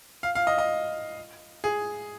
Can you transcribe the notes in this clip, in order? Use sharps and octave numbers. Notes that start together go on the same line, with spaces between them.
F5
F5
D#5
D#5
G#4